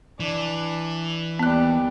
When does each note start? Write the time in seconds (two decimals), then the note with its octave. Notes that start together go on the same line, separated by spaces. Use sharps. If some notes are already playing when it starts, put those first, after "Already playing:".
0.20 E3 D4
1.39 D#2 G3 B3 F#6